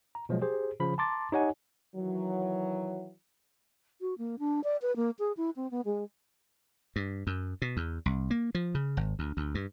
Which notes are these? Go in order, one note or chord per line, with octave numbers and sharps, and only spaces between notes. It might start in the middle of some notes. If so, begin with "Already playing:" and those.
A#5
B2 F3 F#3 G#3
G4 G#4 C5
C#3 F3 B5
A5 A#5 C6 D6 A6
D#4 G4 C#5 D#5 F#5 G#5
D#3 E3 F#3
F#4
A#3
D4
D5
B4
A#3
G#4
E4
C4
B3
G#3
G2
F#2
B2
E2
C2
A#3
F3
C#3
G#1
D2
D2
G2